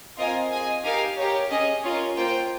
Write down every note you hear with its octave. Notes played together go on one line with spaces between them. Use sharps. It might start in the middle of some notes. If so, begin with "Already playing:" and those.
C4 F4 A#4 D#5 G#5
G#4 D#5 G#5
D#4 G4 A#4 F5 G#5
G4 A#4 C#5
C#4 G#4 D#5 G#5
C#4 F4 A#4
A#3 F4 C5 G5